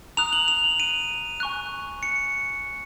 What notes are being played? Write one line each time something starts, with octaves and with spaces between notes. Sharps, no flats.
A#5 D#6 F#6 F7
F#7
F7
F7
D#7
G#5 C#6 F#6
C#7